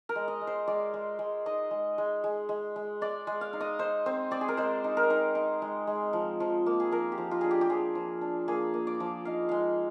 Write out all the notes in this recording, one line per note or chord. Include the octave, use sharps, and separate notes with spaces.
A#4
G#3
D#5
G#3
C5
G#3 D5
G#3
G#3
D#4 D#5
G#3
G#3
G#3
G#3
G#3
G#3 D5
G#3
F5
D#4
D#5
D#4 C5
C4 C5
C4 D5
G#4
A#4
G#3 C5
D#4
A#4
D#4
D#4
G#3
G#3
F3
F3
A#3
G#4
F3 A#4
G4
F3
F4
D4 G#4
G4
G4
F3 G#4
F3
D4
A#3 G#4
A#3
D5
F3
D#4 F5
G#3 F5